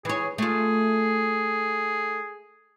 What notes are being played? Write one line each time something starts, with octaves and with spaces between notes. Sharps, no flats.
E3 G#4 C#5
A3 F4 G#4